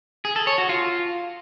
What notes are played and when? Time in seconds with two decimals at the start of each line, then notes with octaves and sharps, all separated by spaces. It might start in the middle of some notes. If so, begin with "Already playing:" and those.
0.25 G#4
0.36 A4
0.47 C#5
0.58 F#4
0.69 F4